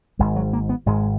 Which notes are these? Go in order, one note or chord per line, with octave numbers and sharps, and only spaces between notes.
G#1 G#2 G#3
F#3
A#3
B3
G#1 G#2 G#3